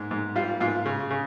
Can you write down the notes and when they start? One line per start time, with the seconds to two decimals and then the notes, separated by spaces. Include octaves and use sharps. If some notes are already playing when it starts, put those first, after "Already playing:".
Already playing: G#2
0.11 G#2
0.35 G3 F4 F5
0.60 G#2 F4 F5
0.86 C#3
1.10 C#3